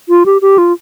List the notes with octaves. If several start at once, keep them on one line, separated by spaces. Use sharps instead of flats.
F4
G4
G4
F4